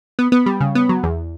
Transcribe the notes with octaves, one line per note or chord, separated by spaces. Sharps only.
B3
B3
G3
C#3
B3
F#3
E2